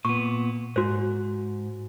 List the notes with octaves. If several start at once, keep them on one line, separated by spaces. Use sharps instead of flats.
A#2 B3 C#6
G#2 F#4 C5